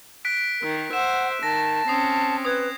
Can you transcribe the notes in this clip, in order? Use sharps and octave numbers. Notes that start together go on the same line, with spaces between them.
F#6 B6 D7
D#3 A#4
C5 E5 F#5 E7
D#3 A5 A#6
C4 C#4 D#6 C7
B4 D#6 G#6